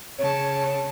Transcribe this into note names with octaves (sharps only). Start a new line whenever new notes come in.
C#3 C#5 A5